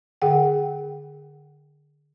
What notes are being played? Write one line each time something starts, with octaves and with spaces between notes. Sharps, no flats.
D3 G#4 F#5 G5